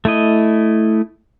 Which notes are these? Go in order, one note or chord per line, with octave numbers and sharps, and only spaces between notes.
A3 E4 D#5